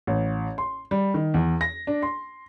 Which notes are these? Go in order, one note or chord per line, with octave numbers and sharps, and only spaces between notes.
A1
C6
G3
D#3
E2
A#6
D4
C6